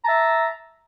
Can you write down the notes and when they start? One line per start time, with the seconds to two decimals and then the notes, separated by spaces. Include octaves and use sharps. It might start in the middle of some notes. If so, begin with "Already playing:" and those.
0.03 A#5
0.05 A5
0.08 E5